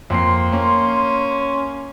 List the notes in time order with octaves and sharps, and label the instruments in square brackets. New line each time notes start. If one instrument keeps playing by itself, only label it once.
[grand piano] F2 A#3 C7 [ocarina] C6
[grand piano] A#3 [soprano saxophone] C#4